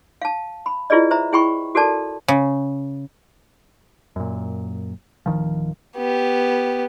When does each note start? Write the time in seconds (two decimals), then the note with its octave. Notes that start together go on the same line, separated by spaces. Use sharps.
0.22 F5 A5
0.66 B5
0.90 E4 F4 G#4 B4 D5 D#5
1.11 C5 E5 A#5
1.33 E4 G#4 G5 B5 C#6
1.75 F#4 A4 A#4 D5 A5
2.28 C#3
4.16 F#2 A#2
5.26 D1 E2 D#3 F3
5.97 B3 G4